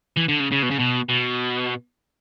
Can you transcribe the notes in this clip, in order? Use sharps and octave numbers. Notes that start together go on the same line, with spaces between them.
E3
D3
C#3
C#3
B2
C#3
B2
B2